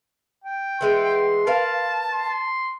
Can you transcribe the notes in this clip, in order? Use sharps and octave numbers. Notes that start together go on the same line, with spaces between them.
G5
E3 G#3 B3 C6
A#4 B4 F5 A5
C6